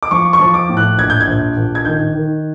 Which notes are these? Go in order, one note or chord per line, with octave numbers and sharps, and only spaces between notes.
D6
F3 C#6
C#6
F3
D6
A2
F#6
A#1 G#6
G6
G#6
A#1
A#1
G#6
D#3 G6
D#3